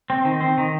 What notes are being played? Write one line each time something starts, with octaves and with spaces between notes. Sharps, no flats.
C4
D#3
C4
D#3